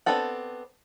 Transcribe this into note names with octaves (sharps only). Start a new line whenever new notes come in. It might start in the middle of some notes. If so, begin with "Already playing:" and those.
B3 C4 D4 A4 F#5